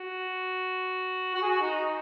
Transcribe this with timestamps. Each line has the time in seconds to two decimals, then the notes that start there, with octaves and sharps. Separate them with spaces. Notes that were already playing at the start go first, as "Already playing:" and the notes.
Already playing: F#4
1.34 F#4
1.42 G#4
1.49 F#4
1.61 D#4